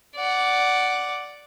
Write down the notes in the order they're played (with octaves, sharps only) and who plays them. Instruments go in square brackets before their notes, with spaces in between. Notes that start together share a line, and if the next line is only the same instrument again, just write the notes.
[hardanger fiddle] D5 F#5